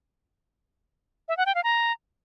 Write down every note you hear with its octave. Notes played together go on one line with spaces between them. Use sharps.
E5
F#5
G5
F5
A#5